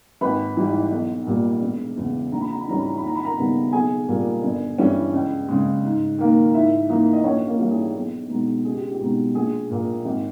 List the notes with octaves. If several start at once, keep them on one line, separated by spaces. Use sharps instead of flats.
G#1 B4 B5
G#2 E3 G3
B1
A#2 G3
E1
E2 C#3
A#1 A#5
B5
A#5
B5
G#2 E3 G3 C#4 A#5
B5
A#5
B5
D#2 A#5
B5
A#4 A#5
C#3 G3 B3 D#4
B1 G#4 G#5
A#2 G3 A#3
G1
G2 E3 G3 C#4
C#2
C#3 G#3
G#2
D#3 A#3
G#2 E4 E5
E3 A#3 D#4
D#5
A#1 C#4 C#5
A#3 A#4
G#2 E3 G3 A#3
G#4
B1
B2 G#3 D#4
C#2 G#4
G4
G4
B2 G#3 D#4
A#1 G#4
A#2 A#3
G#1